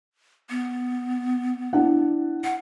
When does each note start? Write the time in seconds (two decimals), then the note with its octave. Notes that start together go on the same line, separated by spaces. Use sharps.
0.50 B3
1.73 D4 E4 F#5
2.44 F#5